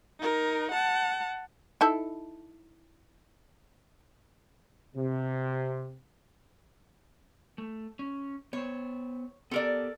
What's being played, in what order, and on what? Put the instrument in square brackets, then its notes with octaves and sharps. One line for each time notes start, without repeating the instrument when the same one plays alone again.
[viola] D#4 A#4
F#5 A5
[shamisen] D#4 E4 A4
[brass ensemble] C3
[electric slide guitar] A3
C#4
[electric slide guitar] B3 C5 [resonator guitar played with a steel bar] C#5
[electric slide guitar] B3 G4 A5 [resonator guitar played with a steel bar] A4 A#4 D5